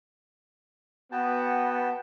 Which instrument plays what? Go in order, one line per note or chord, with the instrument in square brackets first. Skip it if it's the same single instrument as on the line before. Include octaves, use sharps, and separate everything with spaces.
[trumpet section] B3 [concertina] F#4 G5 A5